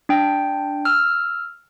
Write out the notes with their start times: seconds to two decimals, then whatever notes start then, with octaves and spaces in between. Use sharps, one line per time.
0.09 D4 G5
0.85 E6 F6